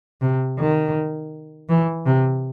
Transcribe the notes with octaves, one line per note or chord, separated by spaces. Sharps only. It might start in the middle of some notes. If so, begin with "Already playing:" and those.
C3
D#3
E3
C3